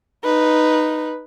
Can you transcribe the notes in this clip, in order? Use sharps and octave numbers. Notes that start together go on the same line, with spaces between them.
D#4 B4